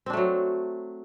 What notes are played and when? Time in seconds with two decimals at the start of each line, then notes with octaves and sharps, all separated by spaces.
0.06 C4
0.10 D4
0.13 A3
0.17 F#3